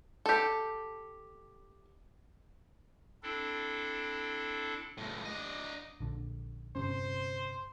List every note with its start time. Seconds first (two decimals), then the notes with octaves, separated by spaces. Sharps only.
0.26 G4 A4
3.23 C4 D4 E4 A4
4.98 C#2 A2
5.25 D4 D#5
6.00 A#1 D3
6.76 G1 C3 C#4 C5